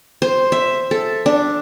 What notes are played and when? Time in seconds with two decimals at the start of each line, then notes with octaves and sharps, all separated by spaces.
0.22 C5
0.52 E5
0.91 A4
1.26 D4